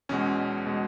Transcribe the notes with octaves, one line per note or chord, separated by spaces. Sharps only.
E2 B2 G#3 C#4
B2 G#3